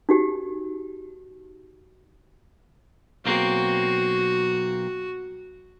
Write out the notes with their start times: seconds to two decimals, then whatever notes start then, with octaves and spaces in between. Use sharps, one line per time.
0.09 D#4 F#4 G4
3.25 B1 A#3 C4 F#4